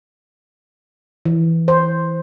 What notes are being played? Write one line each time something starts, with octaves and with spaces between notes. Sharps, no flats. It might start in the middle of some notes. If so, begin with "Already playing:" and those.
E3
C5